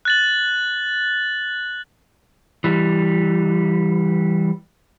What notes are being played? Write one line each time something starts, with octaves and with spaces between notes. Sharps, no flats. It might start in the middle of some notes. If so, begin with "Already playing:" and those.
F#6 A6 F#7
E3 G3